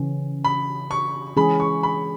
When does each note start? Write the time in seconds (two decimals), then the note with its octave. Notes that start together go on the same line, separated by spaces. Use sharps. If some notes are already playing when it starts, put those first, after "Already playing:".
Already playing: C#3 E3 C#4
0.44 B5
0.91 C#6
1.37 E3 G#3 C#4 G#4 B5
1.60 C#6
1.83 B5